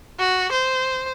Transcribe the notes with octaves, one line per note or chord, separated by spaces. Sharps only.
F#4
C5